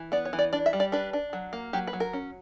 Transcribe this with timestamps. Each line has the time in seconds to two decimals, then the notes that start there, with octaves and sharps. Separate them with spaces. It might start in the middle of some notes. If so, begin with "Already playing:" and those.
Already playing: E3
0.12 B3 D5
0.25 C#5
0.33 E3
0.39 D5
0.53 D4 D5
0.66 E5
0.73 G3
0.80 D5
0.92 D4 B4
1.13 D4
1.33 F#3
1.53 A#3
1.73 F#3 G4
1.87 B4
1.93 F#3
2.00 A#4
2.13 C#4